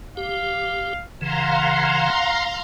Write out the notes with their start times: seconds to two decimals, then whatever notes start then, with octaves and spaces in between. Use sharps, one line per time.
0.17 G4 F5
1.21 C#3 E3 F5 F#5 A#5 C6